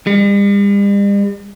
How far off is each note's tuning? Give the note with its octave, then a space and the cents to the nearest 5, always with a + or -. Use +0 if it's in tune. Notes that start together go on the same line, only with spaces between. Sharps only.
G3 +45